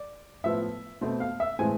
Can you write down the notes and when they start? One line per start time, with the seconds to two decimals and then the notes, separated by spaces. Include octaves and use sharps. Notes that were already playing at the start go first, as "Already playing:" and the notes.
Already playing: D5
0.44 A2 F3 B3 E5
1.01 B2 A3 C4 C5
1.20 F5
1.40 E5
1.59 A2 E3 G#3 C4 G#5